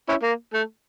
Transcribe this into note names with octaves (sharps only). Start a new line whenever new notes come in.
C#4 E4
A#3
A3